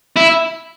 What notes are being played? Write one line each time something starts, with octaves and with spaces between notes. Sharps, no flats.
E4